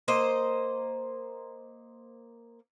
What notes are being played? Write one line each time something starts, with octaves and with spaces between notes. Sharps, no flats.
A#3 C5 D#5